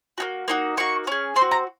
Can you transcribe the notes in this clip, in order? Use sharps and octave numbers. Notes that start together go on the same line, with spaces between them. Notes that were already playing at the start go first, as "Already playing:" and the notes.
A#3 D#4 F#4
A#3 D#4 F#4
A#3 D#4 F#4 C#6
C#4 G#4
C4 C6
F#4
A#5